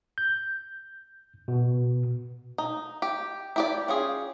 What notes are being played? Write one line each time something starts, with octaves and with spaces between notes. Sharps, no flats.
G6
B2
D#4
G4
E4 G4 D5
C#4 F4 G#4